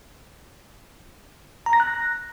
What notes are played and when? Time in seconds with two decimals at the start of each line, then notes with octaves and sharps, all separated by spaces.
1.66 A#5
1.73 A#6
1.80 F#6